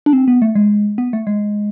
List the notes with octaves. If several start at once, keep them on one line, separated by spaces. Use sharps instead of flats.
D4
C4
B3
A3
G#3
B3
A3
G#3